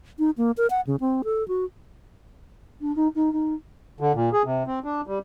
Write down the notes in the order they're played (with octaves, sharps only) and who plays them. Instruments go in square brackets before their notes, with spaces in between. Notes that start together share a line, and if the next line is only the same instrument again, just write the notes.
[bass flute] D#4
A#3
A#4
F#5
C#3
C4
A4
F#4
D4
D#4
D#4
D#4
[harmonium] D3
A#2
G#4
C3
C4
D4
G3